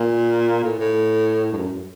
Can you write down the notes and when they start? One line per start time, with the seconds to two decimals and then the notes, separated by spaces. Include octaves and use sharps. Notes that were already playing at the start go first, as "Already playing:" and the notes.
Already playing: A#2
0.63 A2
0.79 A2
1.52 G2
1.57 F#2